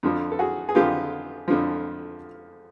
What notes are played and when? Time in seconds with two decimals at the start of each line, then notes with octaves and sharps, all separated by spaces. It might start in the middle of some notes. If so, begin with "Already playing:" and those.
0.03 F2 D3 F3
0.32 A4
0.39 F#4 G#4
0.69 G#4
0.75 F2 D3 F3 F4 G4
1.48 F2 D3 F3